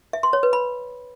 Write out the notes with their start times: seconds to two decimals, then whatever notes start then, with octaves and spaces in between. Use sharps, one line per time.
0.13 E5
0.23 C6
0.33 C#5
0.43 B4
0.53 B5